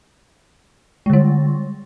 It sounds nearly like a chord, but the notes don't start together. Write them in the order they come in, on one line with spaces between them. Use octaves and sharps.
G#3 D3 G3